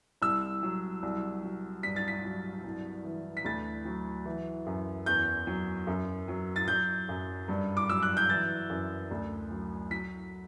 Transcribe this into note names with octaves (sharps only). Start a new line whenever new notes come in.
C2 E6
F#3
C2
F#3
G2 B6
A6
B6
F#3
C2
E3
B6
D2 A6
F#3
E3
F#2
E2 G6
F#3
F#2
F#3
A6
F#3 G6
F#2
G2
D6
F#3 E6
F#6
G6
E3 A6
F#2
D2
F#3
F#3 B6